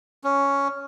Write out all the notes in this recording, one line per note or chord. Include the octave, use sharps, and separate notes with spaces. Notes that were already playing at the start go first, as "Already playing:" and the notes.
C#4